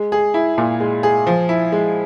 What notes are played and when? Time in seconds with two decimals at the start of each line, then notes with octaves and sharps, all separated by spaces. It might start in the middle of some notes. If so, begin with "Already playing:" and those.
Already playing: G#3
0.12 G#4
0.34 E4
0.58 A#2
0.80 G#3
1.03 G#4
1.27 F3
1.49 E4
1.72 G#3